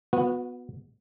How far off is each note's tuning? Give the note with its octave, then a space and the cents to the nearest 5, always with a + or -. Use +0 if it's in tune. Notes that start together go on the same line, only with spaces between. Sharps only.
B3 +0 F#4 -30